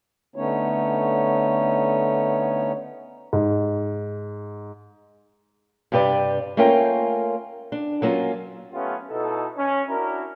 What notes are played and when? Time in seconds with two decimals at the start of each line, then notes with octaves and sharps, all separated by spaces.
0.36 D3 A3 B3 C#4 D#4 C#5
3.33 G#2
5.92 G2 C3 G4 B4 D5
6.57 A3 A#3 C#4 F4 A#4 G5
7.72 D4
8.02 F#3 A#3 C#4 F4
8.73 A3 B3 C#4 F4 G4
9.10 B2 D#4 E4 A4
9.56 C#4
9.89 D4 E4 F#4 A#4